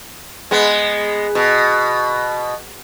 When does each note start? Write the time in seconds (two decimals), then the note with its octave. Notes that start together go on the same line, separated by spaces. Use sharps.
0.51 G#3 B3
1.35 B2